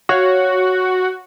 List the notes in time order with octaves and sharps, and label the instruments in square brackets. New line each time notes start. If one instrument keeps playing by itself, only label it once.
[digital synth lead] F#4 [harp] C#5 F5